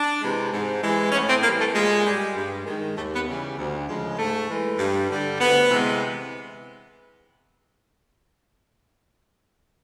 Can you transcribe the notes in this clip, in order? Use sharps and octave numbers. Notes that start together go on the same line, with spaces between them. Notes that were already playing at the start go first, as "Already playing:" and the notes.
Already playing: D4
C3 E3 G#3
G#2
E3 G#3
A2 C#4
C4
E3 G3 A#3
A3
A#2 G#3
G3
G2
D#3 G#3
D#2 A3
B3
C#3 E3 G3
D2
C#3 F3 G#3
G#2 A3
E3 G#3
G2
D3 G3
D2 B3
C3 E3 G#3